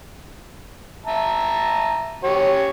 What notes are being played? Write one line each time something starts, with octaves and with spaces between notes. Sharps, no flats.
E5 A5 A#5
C#4 G4 C#5